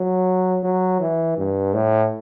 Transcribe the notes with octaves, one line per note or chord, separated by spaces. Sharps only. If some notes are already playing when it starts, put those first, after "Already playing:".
Already playing: F#3
F#3
E3
G2
A2